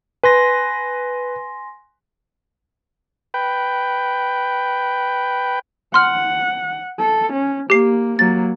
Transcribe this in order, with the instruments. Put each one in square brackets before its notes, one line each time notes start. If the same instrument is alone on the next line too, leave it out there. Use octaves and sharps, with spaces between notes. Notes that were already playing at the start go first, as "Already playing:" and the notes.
[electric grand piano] B4 [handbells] G#5 C6 A#6
[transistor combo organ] B4 G5
[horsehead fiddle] F#5 [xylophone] C6 F6
[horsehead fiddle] A4
C#4
[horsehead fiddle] A#3 [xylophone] G4 C7
[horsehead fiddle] F#3 A#3 [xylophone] A6